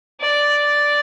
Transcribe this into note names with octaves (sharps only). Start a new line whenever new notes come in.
D5